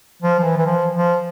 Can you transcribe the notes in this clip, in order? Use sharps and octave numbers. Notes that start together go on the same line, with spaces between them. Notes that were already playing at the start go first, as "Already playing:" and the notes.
F3
F3
E3
E3
F3
F3